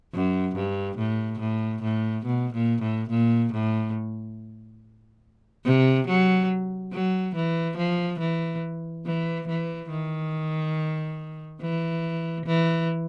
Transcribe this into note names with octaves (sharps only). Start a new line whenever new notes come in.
F#2
G2
A2
A2
A2
B2
A#2
A2
A#2
A2
C3
F#3
F#3
E3
F3
E3
E3
E3
D#3
E3
E3